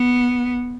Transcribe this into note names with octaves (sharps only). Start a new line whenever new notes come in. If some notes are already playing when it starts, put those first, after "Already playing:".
Already playing: B3